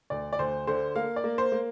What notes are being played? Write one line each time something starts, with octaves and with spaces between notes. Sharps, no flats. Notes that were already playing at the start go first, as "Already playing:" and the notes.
D2 D5
D5
D2 C5
D3 C5
A#3 F5
D5
A#3
C5
A#3